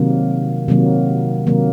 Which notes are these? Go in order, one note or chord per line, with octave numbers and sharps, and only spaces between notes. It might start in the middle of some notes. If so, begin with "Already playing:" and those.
Already playing: C3 D#3 F#3 A#3
C3 D#3 F#3 A#3
C3 D#3 F#3 A#3